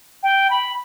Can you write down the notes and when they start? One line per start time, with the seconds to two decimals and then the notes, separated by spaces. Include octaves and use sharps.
0.23 G5
0.50 B5